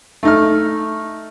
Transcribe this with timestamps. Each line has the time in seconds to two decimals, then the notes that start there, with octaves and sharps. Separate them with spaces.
0.23 A3 D#4 F6